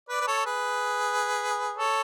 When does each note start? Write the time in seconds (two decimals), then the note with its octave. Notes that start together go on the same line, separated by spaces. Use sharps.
0.09 B4 D5
0.21 B4
0.27 A4 C#5
0.46 G#4 B4
1.77 A4 C#5